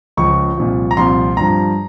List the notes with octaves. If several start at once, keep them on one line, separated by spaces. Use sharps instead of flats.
C#2 C#3 F3 C#6
C2 A#2 F3
A#5
C2 A#2 F3 C6
G2 F3 A#5